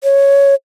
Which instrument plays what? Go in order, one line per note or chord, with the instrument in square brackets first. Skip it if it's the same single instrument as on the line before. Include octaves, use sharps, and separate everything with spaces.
[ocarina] C#5